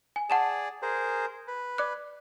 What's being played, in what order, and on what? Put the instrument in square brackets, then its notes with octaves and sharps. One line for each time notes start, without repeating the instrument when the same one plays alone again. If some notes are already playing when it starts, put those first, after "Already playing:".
[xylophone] G#5
[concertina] G#4 D5 [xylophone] F#5 A5 E7
[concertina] G#4 A#4 C5
B4
[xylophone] D5 D6 F#6